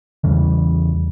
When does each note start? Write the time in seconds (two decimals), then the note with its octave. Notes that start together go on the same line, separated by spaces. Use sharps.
0.24 E2 C#3 E3 G3